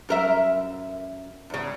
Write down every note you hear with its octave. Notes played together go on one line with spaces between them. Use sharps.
F#2 A#4 E5
E2 C#3